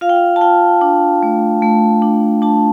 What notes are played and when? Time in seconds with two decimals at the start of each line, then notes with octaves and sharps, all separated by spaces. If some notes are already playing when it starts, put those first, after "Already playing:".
0.01 F4 F5
0.09 G5
0.16 F5
0.36 A5
0.41 F4 G5
0.81 D4
1.23 A3
1.62 A3
2.02 D4
2.42 D4 A5